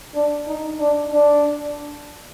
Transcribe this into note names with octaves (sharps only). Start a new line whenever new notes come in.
D4
D#4
D4
D4